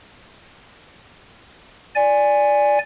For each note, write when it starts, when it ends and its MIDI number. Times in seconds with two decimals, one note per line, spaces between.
1.95 2.78 74
1.95 2.78 80